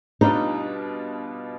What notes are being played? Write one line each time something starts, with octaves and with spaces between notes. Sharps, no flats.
B2 G3 D4 D#4 F4